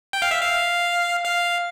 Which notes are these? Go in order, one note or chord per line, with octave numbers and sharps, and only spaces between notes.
G5
F5
E5
F5
F5